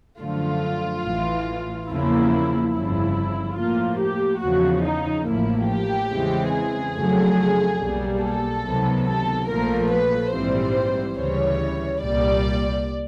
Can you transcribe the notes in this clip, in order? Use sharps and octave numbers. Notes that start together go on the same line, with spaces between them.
F#2 D3 F3 A3 F4
A1 A2 E3
E2 C#3 F3 A#3 E4
G1 F2 C#3 F3 E4
A2 F3 A#3 F4
G4
E2 C#3 F3 F#4
D#4
A1 A2 F3 A#3 E4
G4
E2 C#3 E3 G#3 C4
G#4
F2 C#3 F#3 A3
B1 B2 G3 A#3
A4
C#2 C3 D#3 F#3 B3
A4
A#1 A#2 F3 A3 A#4
B4
A#1 G#2 E3 G3 C4 C5
D2 C#3 E3 G3 C#5
C2 A#2 G3 D5